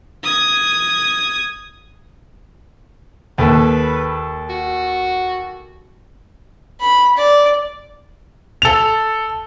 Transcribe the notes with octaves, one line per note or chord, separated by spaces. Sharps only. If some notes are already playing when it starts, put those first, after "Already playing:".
D#6 G#6
D#2 A4 B4
F#4
B5
D5
A4 F7